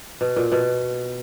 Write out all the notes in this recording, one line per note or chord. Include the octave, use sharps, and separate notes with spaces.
B2
A#2
B2